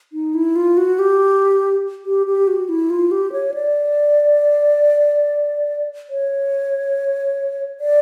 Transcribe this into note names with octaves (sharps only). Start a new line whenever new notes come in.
D#4
E4
F4
F#4
G4
G4
G4
F#4
E4
F4
G4
C#5
D5
C#5
D5